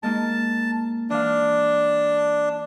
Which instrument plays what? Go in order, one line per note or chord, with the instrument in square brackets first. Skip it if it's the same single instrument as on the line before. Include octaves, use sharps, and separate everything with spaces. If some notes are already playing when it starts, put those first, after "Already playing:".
[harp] G#3 A#3 D#4 [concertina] A5
[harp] E3 F5 [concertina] D4